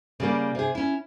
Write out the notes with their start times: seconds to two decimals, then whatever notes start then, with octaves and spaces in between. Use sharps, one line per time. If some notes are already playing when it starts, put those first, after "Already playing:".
0.20 C#3 G3 A#3
0.55 C3 G#4
0.75 C#4 E4